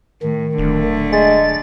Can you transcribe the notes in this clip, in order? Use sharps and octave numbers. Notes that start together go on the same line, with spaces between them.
A2 D#3
D1 D3 A3
G#3 A6